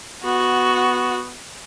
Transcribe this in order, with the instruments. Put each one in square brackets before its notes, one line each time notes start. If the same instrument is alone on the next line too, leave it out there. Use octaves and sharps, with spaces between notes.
[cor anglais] B3 [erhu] F#4